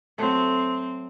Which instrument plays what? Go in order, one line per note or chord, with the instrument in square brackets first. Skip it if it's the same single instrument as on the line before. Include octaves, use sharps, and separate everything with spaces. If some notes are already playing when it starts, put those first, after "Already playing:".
[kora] F#3 A3 [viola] C4